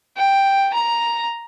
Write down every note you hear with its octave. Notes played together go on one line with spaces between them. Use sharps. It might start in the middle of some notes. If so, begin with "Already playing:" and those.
G5
A#5